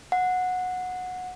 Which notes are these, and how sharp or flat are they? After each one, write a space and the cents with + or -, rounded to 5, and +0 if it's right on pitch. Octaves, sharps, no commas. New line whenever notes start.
F#5 -15